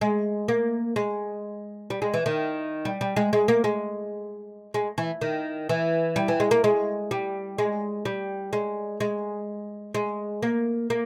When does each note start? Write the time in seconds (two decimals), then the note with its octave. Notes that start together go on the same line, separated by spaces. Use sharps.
0.01 G#3
0.48 A#3
0.96 G#3
1.90 G3
2.02 G#3
2.14 E3
2.26 D#3
2.85 G3
3.01 G3
3.16 G#3
3.33 G#3
3.48 A#3
3.64 G#3
4.74 G#3
4.98 E3
5.21 D#3
5.69 E3
6.16 G3
6.28 E3
6.40 G#3
6.51 A#3
6.64 G#3
7.11 G3
7.58 G#3
8.05 G3
8.53 G#3
9.00 G#3
9.95 G#3
10.42 A#3
10.90 A#3